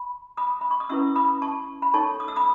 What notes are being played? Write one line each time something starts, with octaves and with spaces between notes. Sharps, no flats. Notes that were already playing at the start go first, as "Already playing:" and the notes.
Already playing: B5
B5 D#6
B5
C#6
D#6
C#4 E4 B4 C#6 E6
B5 D#6
A5 C#6
B5
D#4 A4 C#5 A5 C#6
D#6
E6
B5 D#6